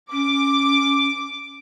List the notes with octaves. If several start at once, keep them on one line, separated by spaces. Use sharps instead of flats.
C#4 D6